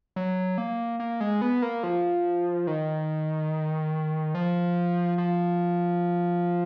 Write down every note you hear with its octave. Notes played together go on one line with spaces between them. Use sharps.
F#3
A#3
A#3
G#3
B3
A#3
F3
D#3
F3
F3